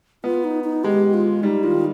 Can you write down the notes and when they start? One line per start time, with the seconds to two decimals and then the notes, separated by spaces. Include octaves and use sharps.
0.24 B3 F4
0.44 D#4
0.64 D#4
0.84 G#3 G4
1.14 F4
1.43 G3 D#4
1.63 D#3 F4